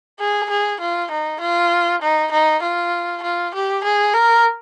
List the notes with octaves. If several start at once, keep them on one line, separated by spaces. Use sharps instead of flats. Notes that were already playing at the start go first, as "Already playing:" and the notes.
G#4
G#4
F4
D#4
F4
D#4
D#4
F4
F4
G4
G#4
A#4